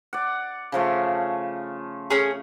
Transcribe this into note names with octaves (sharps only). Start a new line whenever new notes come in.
D5 F#5
C#3 F3 A3
C#4 G#4